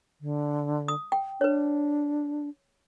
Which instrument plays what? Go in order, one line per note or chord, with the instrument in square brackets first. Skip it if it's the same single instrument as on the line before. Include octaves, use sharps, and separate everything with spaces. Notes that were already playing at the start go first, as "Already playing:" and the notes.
[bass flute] D3
[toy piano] D#6
G5
[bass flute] D4 [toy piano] B4 C#5